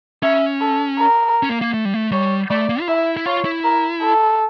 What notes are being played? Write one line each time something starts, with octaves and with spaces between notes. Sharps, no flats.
C#4 E5
A4
A#4
C#4
A#3
A#3
A3
G3
A3
G3 C#5
A3 D5
A#3
F4
E4 E5
E4
F4 C#5
E4
A#4
A4